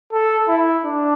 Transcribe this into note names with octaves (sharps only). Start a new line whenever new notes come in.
A4
E4
D4